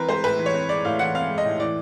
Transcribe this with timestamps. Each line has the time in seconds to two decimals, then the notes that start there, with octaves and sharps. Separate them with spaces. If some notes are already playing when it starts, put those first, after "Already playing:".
Already playing: E3 C4 A#4 B4
0.09 G#3 C5
0.24 A2 B4
0.39 E3
0.46 C#5
0.54 C4
0.69 G#3 D5
0.85 A2 F5
0.99 E3 F#5
1.15 C4 F5
1.30 G#3
1.38 D#5
1.45 A2
1.60 E3 D5